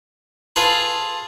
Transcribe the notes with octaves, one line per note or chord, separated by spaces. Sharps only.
F4 G#4 A4 B4